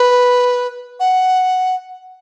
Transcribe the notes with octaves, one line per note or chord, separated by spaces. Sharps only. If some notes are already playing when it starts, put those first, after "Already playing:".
Already playing: B4
F#5